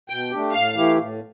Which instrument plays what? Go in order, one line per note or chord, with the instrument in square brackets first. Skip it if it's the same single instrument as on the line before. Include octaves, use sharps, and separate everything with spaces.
[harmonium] B2 [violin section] G5
[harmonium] A3 D4 G4
[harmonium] A2 [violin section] F5
[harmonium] E3 A3 E4 G4
A2